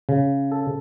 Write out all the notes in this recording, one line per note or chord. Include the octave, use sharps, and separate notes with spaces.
C#3
A4